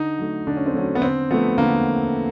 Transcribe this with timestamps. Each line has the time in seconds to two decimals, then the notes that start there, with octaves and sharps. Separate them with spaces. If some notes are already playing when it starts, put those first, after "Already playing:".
Already playing: D3 D#4
0.18 F#3 A3
0.47 D3 D4
0.57 C#4
0.66 C4
0.74 F#3 A3 C#4
0.95 B3
1.02 D3 C4
1.30 F3 A3 B3
1.58 D3 A#3